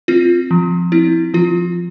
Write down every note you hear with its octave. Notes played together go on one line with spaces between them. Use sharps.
C4 F4
F3
C4 E4
F3 F4